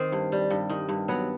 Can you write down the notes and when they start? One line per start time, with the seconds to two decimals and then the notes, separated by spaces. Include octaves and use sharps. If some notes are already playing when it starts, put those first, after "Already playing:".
Already playing: D#3 C4
0.12 G2
0.32 G3
0.50 G2
0.70 D#3
0.89 G2
1.08 F#3 B3